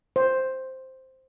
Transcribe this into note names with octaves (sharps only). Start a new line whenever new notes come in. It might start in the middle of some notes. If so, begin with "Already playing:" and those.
C5